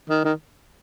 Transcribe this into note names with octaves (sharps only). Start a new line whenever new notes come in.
D#3
D#3